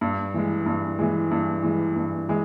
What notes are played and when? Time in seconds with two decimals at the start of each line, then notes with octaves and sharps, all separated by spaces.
0.01 G2
0.34 E3 G#3
0.66 G2
0.99 E3 G#3
1.31 G2
1.63 E3 G#3
1.96 G2
2.29 E3 G#3